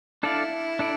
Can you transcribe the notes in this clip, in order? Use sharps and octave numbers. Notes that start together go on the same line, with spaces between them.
D4 E4 A4 D5 F5
D4 A4 D5